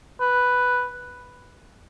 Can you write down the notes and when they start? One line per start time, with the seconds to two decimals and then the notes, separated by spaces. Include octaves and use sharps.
0.20 B4